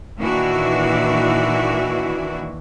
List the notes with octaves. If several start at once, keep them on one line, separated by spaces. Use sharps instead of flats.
A#2 D#3 E3 D4 E4 F#4